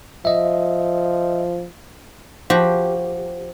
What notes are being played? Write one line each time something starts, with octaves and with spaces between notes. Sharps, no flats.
F3 D#5 E5
F3 F#4 G4